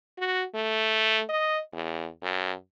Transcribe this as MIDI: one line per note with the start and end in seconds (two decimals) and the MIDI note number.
0.18 0.45 66
0.55 1.22 57
1.29 1.60 75
1.73 2.08 40
2.23 2.53 42